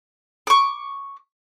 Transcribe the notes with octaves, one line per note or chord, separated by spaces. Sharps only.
C#6 D6